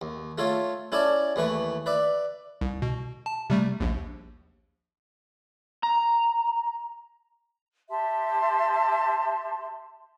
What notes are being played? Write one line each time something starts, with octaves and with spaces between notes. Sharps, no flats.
D#2
A3 F4 A4 C#5 F5
C#4 E4 A4 D5 G#5 A5
D#2 E3 A3 B4 C#6
B4 D5 E5
C2
B2
A5
C3 G3 A3
A#1 D#2
A#5
G4 E5 A5 C6